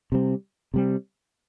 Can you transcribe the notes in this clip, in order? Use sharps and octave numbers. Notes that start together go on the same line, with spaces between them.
C3 G3 C4
C3 G3 C4